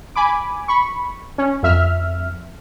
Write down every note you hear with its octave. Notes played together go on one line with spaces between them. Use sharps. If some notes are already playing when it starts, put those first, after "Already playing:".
G#5 B5 D6
B5 C#6
C#4
F2 E5 F6